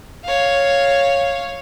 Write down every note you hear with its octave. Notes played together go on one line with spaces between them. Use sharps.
C#5 F5